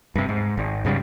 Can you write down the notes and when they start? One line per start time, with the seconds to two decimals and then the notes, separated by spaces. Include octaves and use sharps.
0.15 G2 C3
0.29 G#2
0.57 G#1
0.85 G#2 C#3 F3 G3